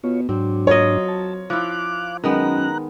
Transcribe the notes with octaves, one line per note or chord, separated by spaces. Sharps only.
B2 F4 C#5
G#2 F#3 C4 D4
F4 A#4 C#5 D#5
A5
F3 E4 F5 D6 F#6
F#2 D#3 G#3 B3 A#5 F#6